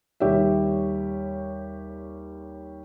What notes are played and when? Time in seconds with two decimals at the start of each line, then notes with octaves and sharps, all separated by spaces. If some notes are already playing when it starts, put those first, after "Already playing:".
0.20 D#2 G3 G4 C#5 E5